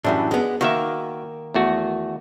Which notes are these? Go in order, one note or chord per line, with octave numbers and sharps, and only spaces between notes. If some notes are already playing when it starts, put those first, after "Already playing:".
F#2 A2 E3 G3 D4
G#3 B3
D#3 A#3 F#4 E5
E2 A3 F#4